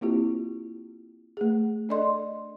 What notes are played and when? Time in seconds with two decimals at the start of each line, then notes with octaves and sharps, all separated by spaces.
0.01 A#3 C4 E4 F4 G4
1.37 A3 G#4
1.89 D4 A4 D5 D#5 C6